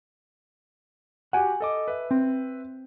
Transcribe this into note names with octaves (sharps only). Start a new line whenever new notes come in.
F#4 G4 F#5 G#5
A4 D#5 D6
B4 E5
C4